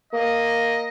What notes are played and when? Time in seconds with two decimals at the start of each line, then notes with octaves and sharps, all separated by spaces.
0.13 A#3 D#5